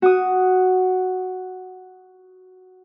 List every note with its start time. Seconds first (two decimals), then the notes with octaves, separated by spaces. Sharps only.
0.02 F#4 D#6